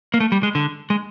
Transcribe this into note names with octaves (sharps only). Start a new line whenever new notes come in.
A#3
A3
G3
G#3
D3
G#3